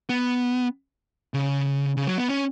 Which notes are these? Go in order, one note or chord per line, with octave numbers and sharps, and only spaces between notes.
B3
C#3
C#3
F#3
B3
C#4